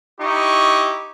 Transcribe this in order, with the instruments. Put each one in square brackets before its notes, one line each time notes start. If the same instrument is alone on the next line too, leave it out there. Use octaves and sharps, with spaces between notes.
[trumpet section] D#4 E4 G4 C#6